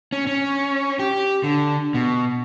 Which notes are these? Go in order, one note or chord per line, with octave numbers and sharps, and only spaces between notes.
C#4
C#4
G4
D3
B2